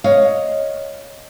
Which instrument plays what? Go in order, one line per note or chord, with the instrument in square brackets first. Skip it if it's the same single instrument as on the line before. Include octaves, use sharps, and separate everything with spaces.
[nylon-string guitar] C#5 D#5 F5